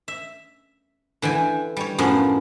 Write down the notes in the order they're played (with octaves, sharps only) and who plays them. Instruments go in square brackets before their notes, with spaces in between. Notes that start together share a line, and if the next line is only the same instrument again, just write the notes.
[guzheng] E5
D3 E3 G5 G#5
G3 C#5
F#2 A2 F3 B3 C#4 D4